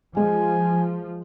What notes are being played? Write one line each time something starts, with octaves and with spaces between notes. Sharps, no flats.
F3 G#3 G#5